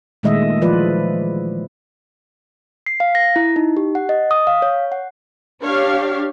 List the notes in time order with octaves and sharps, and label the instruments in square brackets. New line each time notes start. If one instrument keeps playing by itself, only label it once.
[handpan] A#2 D#3 G#3 A3 D#5 E5
E3 F3 F4 B4 D5
[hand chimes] C7
F5
A#6
E4
D#4
G4
F#5
D#5
D#6
F5
C#5
F#5
[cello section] D4 G4 [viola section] C#5 F5